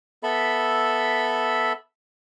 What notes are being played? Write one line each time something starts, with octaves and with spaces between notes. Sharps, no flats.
B3 A4 E5 B5